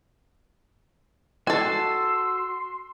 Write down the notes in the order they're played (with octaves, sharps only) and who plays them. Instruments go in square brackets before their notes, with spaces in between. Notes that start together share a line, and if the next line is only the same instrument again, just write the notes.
[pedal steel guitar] F#4 A5 [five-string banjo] A4 G#5 [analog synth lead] C6 [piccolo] E6